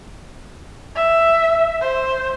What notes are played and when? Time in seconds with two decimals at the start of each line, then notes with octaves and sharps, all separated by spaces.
0.96 E5
1.81 C5